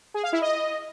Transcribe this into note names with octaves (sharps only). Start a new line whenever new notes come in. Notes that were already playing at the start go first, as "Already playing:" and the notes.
G#4
F5
E4
D#5